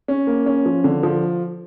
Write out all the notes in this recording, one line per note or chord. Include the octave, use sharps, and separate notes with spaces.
C#4
A#3
C#4
F3
D3
F3